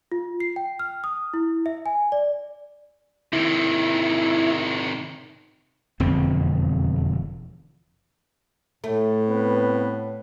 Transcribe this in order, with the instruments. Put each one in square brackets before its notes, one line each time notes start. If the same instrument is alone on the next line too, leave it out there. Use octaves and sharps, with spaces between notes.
[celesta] F4
C7
G5
F6
D#6
E4
E5
G#5
D5
[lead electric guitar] C3 D#3 [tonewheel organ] E4
[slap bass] E1 F2 D3 C4
[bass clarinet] A2 [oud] A3
[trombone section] B3 C4 B4